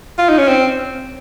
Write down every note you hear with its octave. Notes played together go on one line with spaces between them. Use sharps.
F4
D#4
C#4
C4